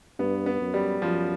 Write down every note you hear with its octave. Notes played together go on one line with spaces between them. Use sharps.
G2 B3
B3
F#2
G3
F#2 F3